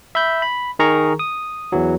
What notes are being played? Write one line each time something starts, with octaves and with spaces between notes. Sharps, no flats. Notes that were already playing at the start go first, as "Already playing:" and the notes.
E5 B5 G6
B5
D#3 G#4 A#4 A#5 C#6
D#6
E2 E3 F#3